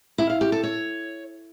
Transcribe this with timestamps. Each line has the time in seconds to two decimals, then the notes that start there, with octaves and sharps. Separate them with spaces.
0.18 E4
0.30 F5
0.41 G4
0.52 A4
0.63 C#5